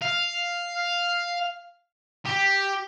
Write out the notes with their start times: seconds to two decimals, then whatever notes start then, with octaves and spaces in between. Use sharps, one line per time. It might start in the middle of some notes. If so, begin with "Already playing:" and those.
0.02 F5
2.26 G4